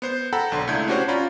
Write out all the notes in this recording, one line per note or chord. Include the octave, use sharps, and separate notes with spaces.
B3 C5 G6
A4 F#5 G5 A#5 B5
B1 D3 A#5 C6
C#2 A3 D4 E4 G6 G#6
C#4 D4 F#4 G4 C5 C#5
C#4 F4 D5 A#5 B5